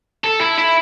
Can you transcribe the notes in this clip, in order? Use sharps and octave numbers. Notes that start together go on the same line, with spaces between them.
A4
E4
E4